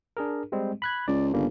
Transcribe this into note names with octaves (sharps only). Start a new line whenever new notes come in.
D4 G#4 A#4
G3 G#3 C4
B5 F#6 G#6
C#2 D5
G1 C#3 G3 A#3